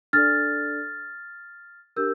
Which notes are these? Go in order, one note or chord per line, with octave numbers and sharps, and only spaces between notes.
D4 A4 D5 F6 A6
D4 G4 A#4 E6 G6